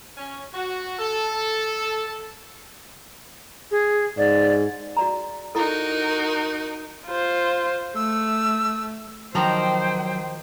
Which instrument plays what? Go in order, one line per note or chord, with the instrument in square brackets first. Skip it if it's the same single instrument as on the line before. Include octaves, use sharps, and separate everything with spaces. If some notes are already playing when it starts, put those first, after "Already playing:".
[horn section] C#4
F#4
A4
[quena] G#4
[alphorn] G#2 [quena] D5
[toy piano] F#4 D5 A#5
[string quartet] D#4 F#4 A#4 [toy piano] E4 A4
[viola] F4 C5
[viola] A3 [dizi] E6
[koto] D#3 F3 A#5 [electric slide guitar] F#3 [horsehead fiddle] C5 G5